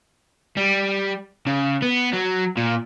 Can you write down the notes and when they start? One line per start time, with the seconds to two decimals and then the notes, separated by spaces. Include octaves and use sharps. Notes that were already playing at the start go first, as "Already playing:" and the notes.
0.57 G3
1.47 C#3
1.82 B3
2.13 F#3
2.57 A#2